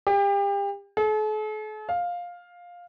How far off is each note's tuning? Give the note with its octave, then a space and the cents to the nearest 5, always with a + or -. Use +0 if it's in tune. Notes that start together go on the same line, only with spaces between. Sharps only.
G4 +35
A4 -45
F5 +10